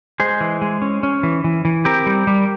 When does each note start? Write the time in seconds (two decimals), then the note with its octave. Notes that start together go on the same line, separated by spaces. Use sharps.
0.20 G#3 G#4 C5
0.41 E3
0.62 G#3
0.82 C#4
1.03 C#4
1.23 E3
1.44 E3
1.65 E3
1.85 C4 G4 A#4
2.06 G3
2.27 G3